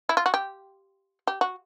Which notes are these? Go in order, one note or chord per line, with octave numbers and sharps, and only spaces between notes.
E4
F4
F#4
G4
G4
F#4